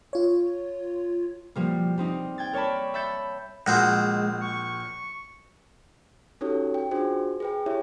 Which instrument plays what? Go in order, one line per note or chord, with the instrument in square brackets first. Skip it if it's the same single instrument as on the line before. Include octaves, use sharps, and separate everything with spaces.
[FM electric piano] F4 C#5
[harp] B2 F3 G3 A#3
G3 C4 D#4
G5 G#6 A6
A#4 C#5 D5 A5 B5
E5 B5 G6 A6 C#7
[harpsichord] A#1 F#4 C5 [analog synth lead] G#3
[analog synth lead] C#6
[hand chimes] C#4 D#4 F#4 G4 A4 C#5
G5
D4 F4 F#4 G#4 C5
G#4 B4 G5
E4 G4 C#5 E5